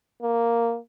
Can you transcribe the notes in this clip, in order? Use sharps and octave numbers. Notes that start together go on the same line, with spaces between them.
A#3